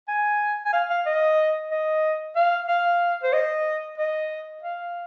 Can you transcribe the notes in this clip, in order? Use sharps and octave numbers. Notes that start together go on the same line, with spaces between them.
G#5
G#5
F5
F5
D#5
D#5
F5
F5
C5
D#5
D#5
F5